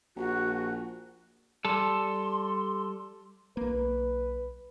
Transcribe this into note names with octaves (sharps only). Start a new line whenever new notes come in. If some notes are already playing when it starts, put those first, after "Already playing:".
A#1 F#4
G3 A4 C6
B1 A#3 B4